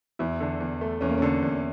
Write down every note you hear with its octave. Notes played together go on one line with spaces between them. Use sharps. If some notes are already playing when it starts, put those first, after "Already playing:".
E2 E4
D3
E2
A3
E2 C#4
A#3
D3 C#4
E2